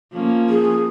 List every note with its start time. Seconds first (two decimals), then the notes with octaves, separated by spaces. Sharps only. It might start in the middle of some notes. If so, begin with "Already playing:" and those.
0.14 F3 A#3 C#4
0.49 G#4